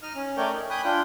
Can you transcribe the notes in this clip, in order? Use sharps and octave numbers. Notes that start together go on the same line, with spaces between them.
D#4 D#5 F6
C#4
A3 A#4 C#5 D5 G5
D#4
G5 G#5 B5 D#6 F#6
D4 F4 G5